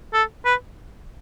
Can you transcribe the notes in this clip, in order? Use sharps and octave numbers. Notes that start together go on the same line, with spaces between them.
A4
B4